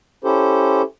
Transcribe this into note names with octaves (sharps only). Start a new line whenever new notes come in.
C#4 E4 G4 A4 C5